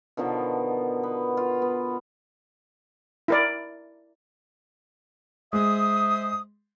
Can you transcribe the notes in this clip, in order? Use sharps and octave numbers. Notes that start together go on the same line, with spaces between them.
B2 D3 D#3 F3
B3
F4
B3
E4 A#4 D5
G#3 C5 E5 D#6